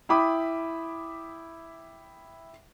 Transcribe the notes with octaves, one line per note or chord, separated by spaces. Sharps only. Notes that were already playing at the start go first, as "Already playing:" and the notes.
E4 E5 G5 B5 D6 D#6